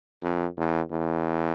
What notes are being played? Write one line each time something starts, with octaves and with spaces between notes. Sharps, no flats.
F2
E2
E2